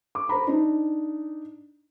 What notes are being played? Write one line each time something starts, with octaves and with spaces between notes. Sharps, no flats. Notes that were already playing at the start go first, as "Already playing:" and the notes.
D6
B4 C5 A#5 B5
D4 D#4